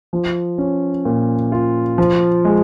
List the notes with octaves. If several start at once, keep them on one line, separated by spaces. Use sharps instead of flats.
F3
C#4
A#2
F4
F3
G#3